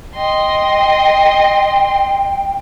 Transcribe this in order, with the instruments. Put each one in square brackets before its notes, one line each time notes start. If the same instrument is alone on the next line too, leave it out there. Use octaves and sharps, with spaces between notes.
[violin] D#5 C6 [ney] G5